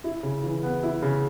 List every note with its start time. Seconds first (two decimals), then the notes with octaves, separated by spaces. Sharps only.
0.04 E4
0.23 C#3
0.44 E3
0.63 B3
0.83 E4
1.02 C#3